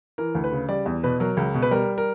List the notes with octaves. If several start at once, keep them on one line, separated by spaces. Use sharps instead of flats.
E3 A#4
D2
B4
C#3
G3 D5
E2
B2 B4
F#3 A#4
C#2
B2
B4
G3 A#4
A#4